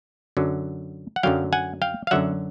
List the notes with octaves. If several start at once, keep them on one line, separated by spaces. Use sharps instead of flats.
F#2 D3 F#3
F#5
F#2 D3 F#3 F5 G5
F#5 G#5
F5 G5
F5
F#2 D3 F#3 E5 F#5